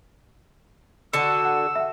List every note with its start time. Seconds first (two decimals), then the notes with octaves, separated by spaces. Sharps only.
1.13 D3 F#4 A4 E6 C#7
1.45 F#5
1.75 E5 F#5